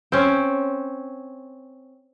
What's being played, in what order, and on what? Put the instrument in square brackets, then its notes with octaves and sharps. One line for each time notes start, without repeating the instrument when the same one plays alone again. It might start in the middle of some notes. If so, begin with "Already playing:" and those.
[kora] C4 C#4